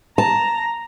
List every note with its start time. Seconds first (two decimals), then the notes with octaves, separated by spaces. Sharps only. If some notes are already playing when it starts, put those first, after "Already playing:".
0.18 A5 A#5